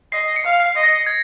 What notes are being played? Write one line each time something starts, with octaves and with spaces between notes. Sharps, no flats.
D#5 C7
C#7
F5
C7
D#5
A#6
G#6